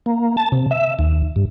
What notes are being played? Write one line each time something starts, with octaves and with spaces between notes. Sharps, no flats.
A#3
A5
C3
E5
D#2
G2